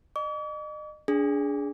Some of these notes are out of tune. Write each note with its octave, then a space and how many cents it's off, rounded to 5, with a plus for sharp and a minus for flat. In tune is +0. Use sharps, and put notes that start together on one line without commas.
D#5 -35 D6 -45
D4 -25 G#4 +0